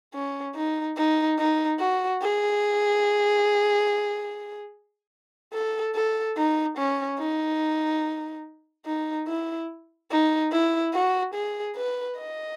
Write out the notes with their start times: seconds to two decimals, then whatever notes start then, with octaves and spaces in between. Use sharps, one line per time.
0.14 C#4
0.55 D#4
0.97 D#4
1.38 D#4
1.79 F#4
2.22 G#4
5.53 A4
5.95 A4
6.37 D#4
6.77 C#4
7.19 D#4
8.86 D#4
9.27 E4
10.11 D#4
10.52 E4
10.93 F#4
11.34 G#4
11.76 B4
12.18 D#5